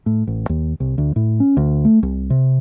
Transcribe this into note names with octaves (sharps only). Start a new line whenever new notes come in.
A2
A1
D#2
C2
D2
A2
C#4
D2
A3
C2
C3